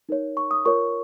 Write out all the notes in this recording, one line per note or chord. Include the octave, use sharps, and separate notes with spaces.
D#4 A#4 C#5
C#6
D#6
F4 A#4 C#5 C#6